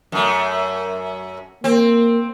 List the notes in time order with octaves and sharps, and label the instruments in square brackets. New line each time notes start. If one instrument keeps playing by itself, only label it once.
[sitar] F#2 A3
[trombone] A#3 [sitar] C4